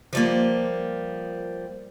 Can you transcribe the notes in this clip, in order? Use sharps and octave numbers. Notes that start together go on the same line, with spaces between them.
F3 G3 A#3